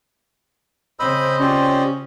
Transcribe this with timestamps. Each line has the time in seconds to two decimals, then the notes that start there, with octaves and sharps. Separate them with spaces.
1.00 C#3 C4 C5 D#5 B5 E6
1.40 C#4 F4 G4 D5